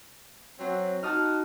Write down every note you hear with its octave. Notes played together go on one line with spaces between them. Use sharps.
F#3 C4
D#4 F#4 A5 D#6 F6